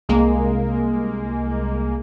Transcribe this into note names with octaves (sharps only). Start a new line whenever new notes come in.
C2 G#3 A#3